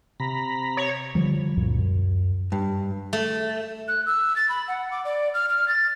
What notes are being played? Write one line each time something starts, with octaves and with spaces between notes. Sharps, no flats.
C3 A#5 B5
C#5
D3 F3 G3
C#2 F#2 A#2
F#2
G2
A3
F#6
E6
A6
B5
F#5
D6
D5
F6
F6
A6